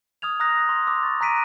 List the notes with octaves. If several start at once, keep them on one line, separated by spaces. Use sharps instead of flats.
D#6 F6 G#6 F7
A#5 D#6 F6 F#6 A#6
C6
C6 D6 E6
C#6 A6
A#5 F#6 A#6 B6 D7 D#7